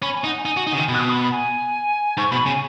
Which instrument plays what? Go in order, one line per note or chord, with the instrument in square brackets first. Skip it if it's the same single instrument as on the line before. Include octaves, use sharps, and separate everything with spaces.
[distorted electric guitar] C#4 [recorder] B5
[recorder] G#5
[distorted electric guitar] D#4
[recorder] F#5
G#5
[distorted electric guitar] D#4
F#4
D#4
C#3
D#3
[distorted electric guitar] B2 [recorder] B5
[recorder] F#6
D#6
B5
B5
G#5
[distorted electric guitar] G#2 [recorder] C#6
[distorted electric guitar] B2 [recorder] B5
[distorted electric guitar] C#3 [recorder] G#5